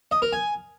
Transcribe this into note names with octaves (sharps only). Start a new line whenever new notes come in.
D#5
A#4
G#5